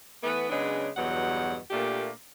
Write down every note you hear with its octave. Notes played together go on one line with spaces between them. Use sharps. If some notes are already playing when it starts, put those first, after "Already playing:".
E3 A3 B3
C#3 F#3 G#3 B3 D4
E2 G2 B2 F#3 F#5
A#2 A3 A#3 D4 G4